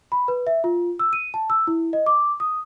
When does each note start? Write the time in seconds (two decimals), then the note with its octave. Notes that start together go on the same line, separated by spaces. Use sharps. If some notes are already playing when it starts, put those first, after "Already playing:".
0.12 B5
0.28 B4
0.47 E5
0.64 F4
0.99 E6
1.13 D#7
1.34 A5
1.50 E6
1.67 E4
1.93 D#5
2.06 D6
2.40 D#6